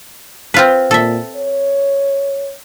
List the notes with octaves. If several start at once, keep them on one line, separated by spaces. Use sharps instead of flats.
C4 F4 B4
A#2 A4 E5
C#5